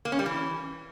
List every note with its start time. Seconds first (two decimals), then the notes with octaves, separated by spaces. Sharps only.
0.05 A#3
0.12 C#4
0.19 G3
0.26 E3